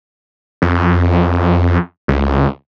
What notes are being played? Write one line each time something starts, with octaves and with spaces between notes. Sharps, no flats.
F2
C#2